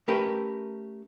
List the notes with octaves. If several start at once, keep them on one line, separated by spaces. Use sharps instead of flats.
A3 C#4 G4 A#4 B4